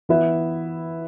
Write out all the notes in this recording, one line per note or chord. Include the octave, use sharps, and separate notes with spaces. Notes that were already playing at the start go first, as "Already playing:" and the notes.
E3 B3 E4 B4 E5